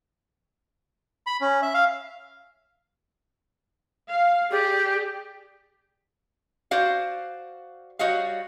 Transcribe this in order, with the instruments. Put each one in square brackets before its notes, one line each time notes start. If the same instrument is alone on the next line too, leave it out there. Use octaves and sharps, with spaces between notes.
[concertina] B5
C#4
E5
F5
[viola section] F5
[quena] G4 [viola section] G#4 D5
[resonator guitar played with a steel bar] F#4 C5 D5 F5
G3 F#4 C#5 D#5 F5